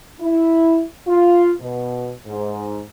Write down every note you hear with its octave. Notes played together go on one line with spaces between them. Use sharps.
E4
F4
B2
G#2